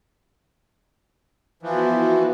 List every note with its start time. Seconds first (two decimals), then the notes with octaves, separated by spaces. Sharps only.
1.63 E3 F3 B3 E4 F#4